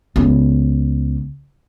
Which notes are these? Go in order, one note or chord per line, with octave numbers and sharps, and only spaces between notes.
C#2 B3